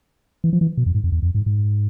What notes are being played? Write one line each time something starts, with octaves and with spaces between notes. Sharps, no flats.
E3
F3
E3
B2
F2
G#2
F2
E2
F2
G#2
G#2